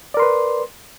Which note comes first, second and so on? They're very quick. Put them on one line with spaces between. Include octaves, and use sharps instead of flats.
D5 A#4 C6 B4